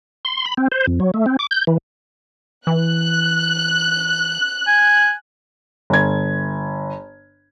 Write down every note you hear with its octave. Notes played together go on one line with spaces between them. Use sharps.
C6
B5
C4
C5
F2
F#3
A3
C4
D6
G6
E3
E3 F#6
G#5
G1 G#6